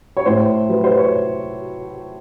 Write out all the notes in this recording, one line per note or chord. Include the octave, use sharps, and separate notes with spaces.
C#5
A2 C5
F#3 B4
C5
C#5